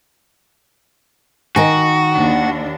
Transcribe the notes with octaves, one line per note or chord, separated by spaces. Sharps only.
D#3 F#4 G#5
D#2 D4